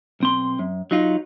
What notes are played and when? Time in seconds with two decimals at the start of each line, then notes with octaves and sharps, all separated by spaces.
0.20 B1 C4 C6
0.59 F#2
0.91 F#3 D#4 F4